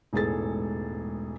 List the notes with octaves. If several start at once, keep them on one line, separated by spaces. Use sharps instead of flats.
E1 A1 G#2 G#4 A4 A6